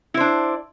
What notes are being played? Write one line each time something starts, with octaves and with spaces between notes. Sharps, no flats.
D4 E4 C5